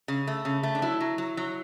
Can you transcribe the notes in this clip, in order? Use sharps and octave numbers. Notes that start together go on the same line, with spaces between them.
C#3
A3
C#3
A3
D4
F#3 E4
F#3
F#3
F#3